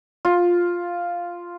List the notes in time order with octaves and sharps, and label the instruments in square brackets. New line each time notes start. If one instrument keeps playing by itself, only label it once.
[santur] F4